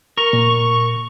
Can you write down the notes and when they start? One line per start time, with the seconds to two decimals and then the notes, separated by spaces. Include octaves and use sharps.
0.17 A#4 C#6
0.33 A#2